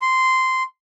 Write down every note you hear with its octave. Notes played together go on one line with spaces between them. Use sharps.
C6